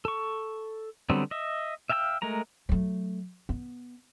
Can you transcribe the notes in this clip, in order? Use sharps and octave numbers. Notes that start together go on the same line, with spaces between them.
A4 C#6
D3 F#3 G3 B3 C4
D#5 E5
E5 F5 G5 A5 E6
G#3 A3 A#4 A#5
F#3 A3
B3